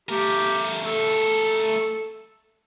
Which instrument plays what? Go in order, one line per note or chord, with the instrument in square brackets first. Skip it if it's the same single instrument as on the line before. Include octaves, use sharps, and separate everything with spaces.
[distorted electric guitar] A3 A#4 [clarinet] G4
[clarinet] A4